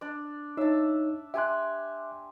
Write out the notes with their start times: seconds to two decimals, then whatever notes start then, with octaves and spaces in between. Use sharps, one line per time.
0.01 D4 D5
0.57 D#4 C#5 E5 A5
1.34 G4 E5 G#5 C6 F#6